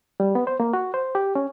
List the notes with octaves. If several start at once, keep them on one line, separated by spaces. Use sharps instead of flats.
G3
B3
C5
A#3
F#4
C5
G4
C#4